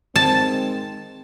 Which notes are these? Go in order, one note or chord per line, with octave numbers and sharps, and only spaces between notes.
D#3 G#3 C4 A5